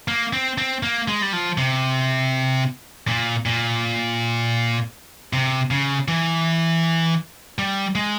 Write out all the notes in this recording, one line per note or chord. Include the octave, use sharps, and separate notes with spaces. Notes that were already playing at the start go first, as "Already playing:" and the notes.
A#3
C4
C4
A#3
G#3
G3
F3
C3
A#2
A#2
C3
C#3
E3
G3
G#3